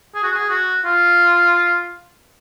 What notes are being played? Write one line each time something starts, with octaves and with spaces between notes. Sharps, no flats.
G#4
F#4
G#4
F#4
F4